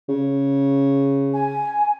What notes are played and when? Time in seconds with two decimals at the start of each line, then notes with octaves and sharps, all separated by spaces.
0.08 C#3
1.34 G#5